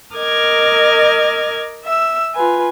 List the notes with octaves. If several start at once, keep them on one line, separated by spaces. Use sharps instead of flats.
A#4 D#5 D6 F6 G#6
E5 E6
F4 B4 G#5